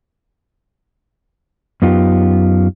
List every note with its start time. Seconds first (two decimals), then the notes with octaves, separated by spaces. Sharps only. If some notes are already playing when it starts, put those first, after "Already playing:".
1.82 F#2 B3 D#4 F4 G4